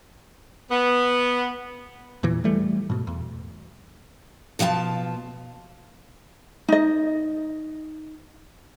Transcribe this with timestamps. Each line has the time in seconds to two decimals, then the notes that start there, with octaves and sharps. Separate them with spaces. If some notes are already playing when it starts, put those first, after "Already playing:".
0.71 B3
2.23 E2 A#2 E3
2.44 E3 G3 A3
2.90 G#2 B2
3.07 E2
4.59 B2 F3 F4 E5 A5
6.68 D#4 D#5